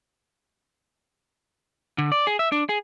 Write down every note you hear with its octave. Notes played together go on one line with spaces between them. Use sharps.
D3
D5
G#4
E5
D4
G#4